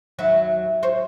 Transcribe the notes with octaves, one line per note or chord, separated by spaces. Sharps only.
D#2 F#3 E5
C5 C#5